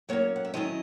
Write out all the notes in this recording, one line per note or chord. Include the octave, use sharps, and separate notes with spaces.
F#3 A#3 C#4 C#5
F#5
E5
D#3 F#3 C#4 E4 D#5